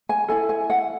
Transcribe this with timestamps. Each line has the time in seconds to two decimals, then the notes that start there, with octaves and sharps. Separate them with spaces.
0.09 G#5
0.28 E4 A4 G#5
0.49 G#5
0.70 F#5